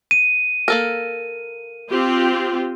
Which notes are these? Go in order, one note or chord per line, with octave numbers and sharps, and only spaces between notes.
D#7
A#3 A4 A#4
C4 F4 G4